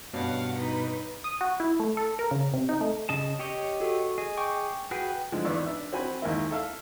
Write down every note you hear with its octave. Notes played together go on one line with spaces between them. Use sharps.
G2 B2 C#4 F5 F#5
D#4 B4
D#6
F#4
E4
A3
A4
A#4
C#3
C3
D#4
A3
C#3 D#5 A5
G4 C#5 D#5
F#4 A4
G#4 D#5
G5 C#6 D6
F#4 G#4 B4 G5
D3 F3 G#3
G#1 E2 B3 D5
D4 E5
C4 F#4 G#5 B5
D#2 G#3 A#3 E4
A4 E5 F5